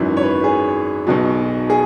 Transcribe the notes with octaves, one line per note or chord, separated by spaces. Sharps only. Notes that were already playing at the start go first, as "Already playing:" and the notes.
Already playing: G#1 F#2 E3 F#4
C#5
B4
G#4
B1 B2 F#3
G#4